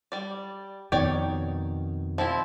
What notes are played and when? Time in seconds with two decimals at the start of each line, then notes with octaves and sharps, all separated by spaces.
0.12 G3 D5
0.92 F2 B2 D#3 C#5 D5 G5
2.18 F3 C4 E4